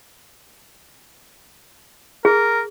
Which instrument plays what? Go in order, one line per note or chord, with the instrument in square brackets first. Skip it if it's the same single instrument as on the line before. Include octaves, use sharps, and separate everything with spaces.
[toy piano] G#4 [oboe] A#4